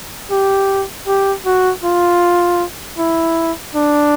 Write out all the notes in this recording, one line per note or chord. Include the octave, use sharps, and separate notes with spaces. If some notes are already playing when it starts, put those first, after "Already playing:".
G4
G4
F#4
F4
E4
D4